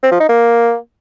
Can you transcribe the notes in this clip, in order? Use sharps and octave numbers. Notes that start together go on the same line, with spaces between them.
C4
F3
D#4
A#3